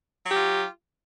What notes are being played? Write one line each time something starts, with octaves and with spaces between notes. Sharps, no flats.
F#3 F4 G4